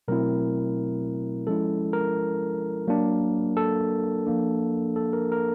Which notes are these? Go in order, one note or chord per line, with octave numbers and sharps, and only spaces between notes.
B2 F#3 A3 C4 E4 A#4
F3 G#3 C#4 E4 A4
A#4
F#3 A#3 D4
A4
F3 A#3 D4
A4
A#4
A#4